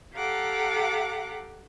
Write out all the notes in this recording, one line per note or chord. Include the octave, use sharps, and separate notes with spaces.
G4 A4 F5 F#5 A#5 D6